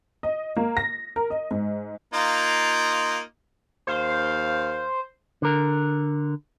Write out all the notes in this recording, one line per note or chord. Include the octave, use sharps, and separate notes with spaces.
D#5
A#3
A#6
A#4
D#5
G#2
A#3 D#4 F4
D#2 C5 F5
D3 A#4